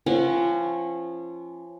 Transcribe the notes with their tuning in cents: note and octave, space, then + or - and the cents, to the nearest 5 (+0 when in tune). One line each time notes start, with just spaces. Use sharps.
F3 -30 C#4 -25 F#5 +0